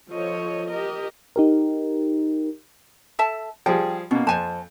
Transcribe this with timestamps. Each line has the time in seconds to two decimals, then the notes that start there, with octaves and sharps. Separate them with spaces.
0.10 F3 A4 C#5 D#5
0.70 G4 A#4 D#5
1.36 D#4 G4 A#4
3.19 A4 E5 A5
3.66 F3 G3 G#4 G5
4.11 B2 A#3 C#4
4.27 F2 C5 G#5 A5